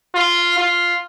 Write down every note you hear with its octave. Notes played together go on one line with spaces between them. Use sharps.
F4
F4